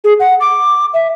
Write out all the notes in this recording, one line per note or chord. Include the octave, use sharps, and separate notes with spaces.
G#4
F#5
D6
E5